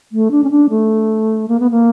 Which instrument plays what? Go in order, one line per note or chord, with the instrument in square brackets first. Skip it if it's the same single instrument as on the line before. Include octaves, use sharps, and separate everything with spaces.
[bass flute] A3
D4
C#4
D4
A3
A#3
B3
A#3